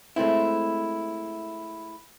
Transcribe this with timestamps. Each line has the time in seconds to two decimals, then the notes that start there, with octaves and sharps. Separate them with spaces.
0.16 G#3 A3 C4 E4